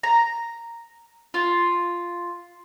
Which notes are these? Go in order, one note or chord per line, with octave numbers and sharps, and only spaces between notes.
A#5
F4